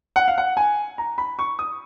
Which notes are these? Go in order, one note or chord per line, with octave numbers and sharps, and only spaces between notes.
F#5
F5
F#5
G#5
A#5
B5
C#6
D#6